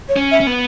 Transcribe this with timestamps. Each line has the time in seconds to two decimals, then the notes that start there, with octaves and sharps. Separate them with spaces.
0.09 C#5
0.16 C#4
0.31 E5
0.40 C#4
0.47 B3